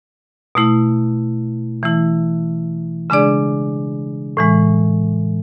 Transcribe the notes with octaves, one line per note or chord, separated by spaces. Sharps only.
B2 A3 E4
E3 A3 E4
C#3 G#3 D4 G#4 D5
A2 E3 G#3